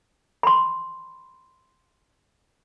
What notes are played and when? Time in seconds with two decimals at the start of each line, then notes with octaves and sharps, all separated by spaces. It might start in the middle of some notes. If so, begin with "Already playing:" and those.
0.43 B5 C6